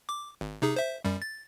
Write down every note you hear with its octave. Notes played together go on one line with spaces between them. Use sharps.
D6
G#1
C3 D#4 G#4
C5 E5
F#2 G3
A6